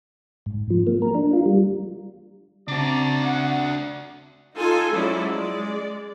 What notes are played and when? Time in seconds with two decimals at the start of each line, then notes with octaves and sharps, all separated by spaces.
0.46 G#2
0.70 F3
0.87 A#3
1.02 A#4
1.15 D4
1.33 F4
1.46 G3
2.68 C#3 C4 D4 F#4 D5 A5 A#5
3.23 F#5
4.56 D#4 F4 A4 G#5
4.92 F3 F#3 G#3 C#4 E4 D5
5.33 G#3 D5